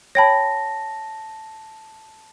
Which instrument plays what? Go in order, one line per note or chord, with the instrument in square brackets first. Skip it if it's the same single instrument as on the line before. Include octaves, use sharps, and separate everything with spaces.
[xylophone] C#5 G5 B5 [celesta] A5 A#6